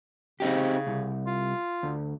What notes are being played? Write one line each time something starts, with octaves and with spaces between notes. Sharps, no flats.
C#3 C4 D#4 G4
C2
F4
D2